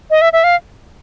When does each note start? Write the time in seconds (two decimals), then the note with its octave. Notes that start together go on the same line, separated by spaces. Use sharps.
0.10 D#5
0.21 E5
0.33 E5
0.44 F5